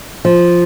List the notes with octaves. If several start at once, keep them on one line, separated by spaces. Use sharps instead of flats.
F3